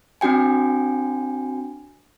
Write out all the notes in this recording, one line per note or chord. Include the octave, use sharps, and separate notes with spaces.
C4 D4 F#4 G5 G#5